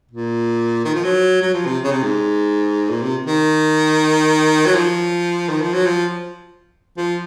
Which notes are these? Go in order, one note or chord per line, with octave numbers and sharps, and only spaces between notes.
A#2
D#3
F3
F#3
F#3
F3
C3
C#3
C3
G#2
A#2
C3
D#3
F#3
F3
D#3
F3
F#3
F3
F3